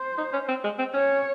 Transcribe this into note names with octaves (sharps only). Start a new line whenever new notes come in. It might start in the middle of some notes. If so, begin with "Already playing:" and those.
Already playing: C5
D#4
C#4
C4
G#3
C4
C#4 C#5